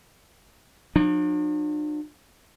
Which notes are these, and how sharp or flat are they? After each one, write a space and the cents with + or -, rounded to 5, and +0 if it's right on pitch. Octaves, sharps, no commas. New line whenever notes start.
F#3 -45 D4 +45